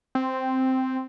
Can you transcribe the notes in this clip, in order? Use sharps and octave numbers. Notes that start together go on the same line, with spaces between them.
C4